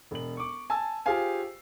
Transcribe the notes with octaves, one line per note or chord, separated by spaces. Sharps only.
E1 F#7
C#6 D6
G#5 A5 E6
F4 G4 G#4 C5 F5 G#5